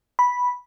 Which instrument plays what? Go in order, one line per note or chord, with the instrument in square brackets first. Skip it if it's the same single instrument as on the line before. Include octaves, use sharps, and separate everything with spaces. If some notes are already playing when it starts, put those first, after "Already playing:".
[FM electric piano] B5